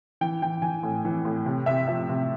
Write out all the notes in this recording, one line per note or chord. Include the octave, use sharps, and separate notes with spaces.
E3 G5
E3 G5
E3 G#5
A2
E3
A2
C3
C3 E5
F3 E5
C3